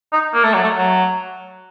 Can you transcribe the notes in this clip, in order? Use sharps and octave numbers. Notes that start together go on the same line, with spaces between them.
D#4
A#3
A3
F#3
A3
F#3